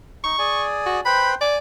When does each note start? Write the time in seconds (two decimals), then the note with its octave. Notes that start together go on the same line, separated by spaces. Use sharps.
0.24 D#4 C#6
0.39 G#4 D5 G#5
0.86 F#4
1.06 B4 C5 G5 B5
1.41 D5 G#5